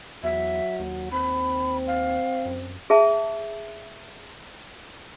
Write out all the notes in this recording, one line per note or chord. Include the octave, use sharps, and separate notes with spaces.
E2 F#3 E5
D#2
C4 B5
F5
F#2
G#4 E5 A5